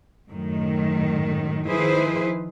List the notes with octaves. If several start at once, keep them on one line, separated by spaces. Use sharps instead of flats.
F#2 A2 D#3
D#3 F3 E4 G#4 B4 C5